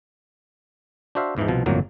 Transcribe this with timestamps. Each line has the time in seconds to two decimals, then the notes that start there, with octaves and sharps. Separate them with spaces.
1.15 D4 F#4 C5 E5 F5
1.37 E2 G#2 E3 F3 D#4
1.48 C2 B2 F3
1.66 G1 F2 A2 F#3 A#3